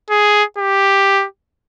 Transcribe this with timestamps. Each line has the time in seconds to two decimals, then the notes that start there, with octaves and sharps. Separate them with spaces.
0.10 G#4
0.58 G4